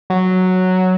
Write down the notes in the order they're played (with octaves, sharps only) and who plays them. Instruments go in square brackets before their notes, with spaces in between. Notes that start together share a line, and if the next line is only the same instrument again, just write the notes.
[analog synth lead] F#3